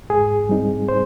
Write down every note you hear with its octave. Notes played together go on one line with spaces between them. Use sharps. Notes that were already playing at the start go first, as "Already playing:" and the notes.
G#2 G#4
G3 C4 D#4
C5